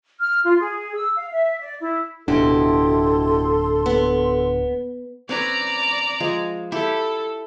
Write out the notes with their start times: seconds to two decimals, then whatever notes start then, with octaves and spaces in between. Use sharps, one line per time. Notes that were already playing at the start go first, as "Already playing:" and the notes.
0.19 F6
0.43 F4
0.59 G#4
0.95 E6
1.15 F5
1.32 E5
1.61 D5
1.81 E4
2.28 D1 B2 D4 E4 G4 A4 C6
3.86 B3
5.29 C4 C#4 B4 D5 A#5
6.20 F3 G#3
6.72 E4 G4 A4